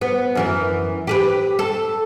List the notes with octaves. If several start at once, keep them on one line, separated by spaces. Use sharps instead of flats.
B3
F#2 E3 A#4
G4 G#4 B4
A4